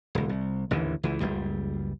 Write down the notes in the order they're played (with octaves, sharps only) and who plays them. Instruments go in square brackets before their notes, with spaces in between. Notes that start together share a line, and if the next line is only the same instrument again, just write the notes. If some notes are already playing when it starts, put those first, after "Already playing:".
[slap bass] D#1 C#2
C2
A1 D#2 D3 E3
C#2 E3
F#1 C#2 G3